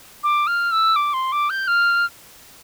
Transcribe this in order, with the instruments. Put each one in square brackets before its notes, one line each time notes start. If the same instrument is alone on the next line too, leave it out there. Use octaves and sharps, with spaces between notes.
[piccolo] D6
F6
E6
D6
C6
D6
G6
F6